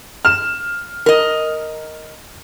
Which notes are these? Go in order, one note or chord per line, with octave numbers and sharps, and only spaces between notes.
F6 E7
A#4 D#5